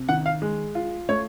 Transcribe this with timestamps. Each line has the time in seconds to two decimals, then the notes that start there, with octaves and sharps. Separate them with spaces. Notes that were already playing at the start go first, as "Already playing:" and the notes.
Already playing: C3
0.09 D#3 F#5
0.26 F5
0.42 G#3
0.75 F4
1.09 A3 C#5